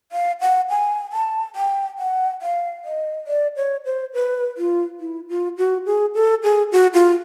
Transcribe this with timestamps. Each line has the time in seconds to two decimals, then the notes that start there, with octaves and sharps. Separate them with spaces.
0.12 F5
0.41 F#5
0.70 G#5
1.13 A5
1.56 G5
1.98 F#5
2.42 F5
2.85 D#5
3.27 D5
3.56 C#5
3.85 C5
4.14 B4
4.57 F4
5.00 E4
5.29 F4
5.58 F#4
5.86 G#4
6.15 A4
6.43 G#4
6.72 F#4
6.94 F4